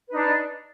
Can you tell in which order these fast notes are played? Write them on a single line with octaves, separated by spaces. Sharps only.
B4 D#4 D4